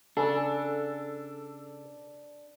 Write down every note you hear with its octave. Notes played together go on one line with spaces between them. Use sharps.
C#3 D4 A4